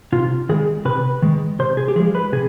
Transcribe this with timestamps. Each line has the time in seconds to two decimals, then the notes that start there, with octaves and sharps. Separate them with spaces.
0.12 C3 F4
0.49 D#3 G#3 G#4
0.85 C3 B4
1.22 D#3 G#3
1.59 C3 C5
1.77 G#4
1.88 G4
1.96 F3 G#4
2.00 G#3
2.15 B4
2.32 C3 G#4